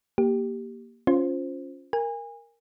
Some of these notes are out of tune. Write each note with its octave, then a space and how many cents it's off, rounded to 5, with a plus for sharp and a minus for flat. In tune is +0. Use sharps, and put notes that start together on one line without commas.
A#3 +10 G4 +0
C#4 +0 F4 +0 C5 +0
A#4 +0 G#5 -30